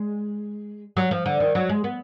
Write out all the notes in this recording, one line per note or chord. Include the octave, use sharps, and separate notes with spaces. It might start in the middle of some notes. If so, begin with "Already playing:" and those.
Already playing: G#3
F#3
F3
D3
D#3
F#3
G#3
B3